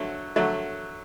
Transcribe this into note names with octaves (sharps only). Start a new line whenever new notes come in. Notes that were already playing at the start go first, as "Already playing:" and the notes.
Already playing: D3 F#3 A3
D3 F#3 A3